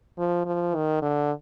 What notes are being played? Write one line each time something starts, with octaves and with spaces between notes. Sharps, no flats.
F3
F3
D#3
D3